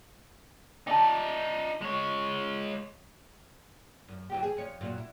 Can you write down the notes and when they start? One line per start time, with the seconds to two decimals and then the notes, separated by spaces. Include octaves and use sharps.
0.87 D#4 D5 G5 A5
1.82 G#3 C#5
4.08 F#2
4.30 E3 F#3 G4
4.43 G#4
4.57 F2 C#5
4.81 F#2 A#2 F#3
4.98 E4